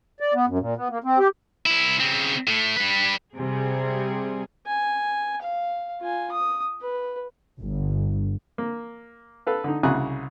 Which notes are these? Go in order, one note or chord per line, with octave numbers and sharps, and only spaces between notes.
D5
B3
F#2
A#2
B3
A#3
C4
G4
C2 E4
C#3 C4
A2 A3
G3 B4
C3 G3 G#4
G#5
F5
F4 G#5
D#6
B4
G1
A#3
A4 B4 F5
D3 D#4
C2 C#3 F#4 G#5 A#5 F#6